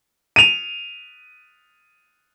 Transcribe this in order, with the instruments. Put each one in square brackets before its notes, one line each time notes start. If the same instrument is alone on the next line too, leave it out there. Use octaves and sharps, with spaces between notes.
[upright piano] D#7 F7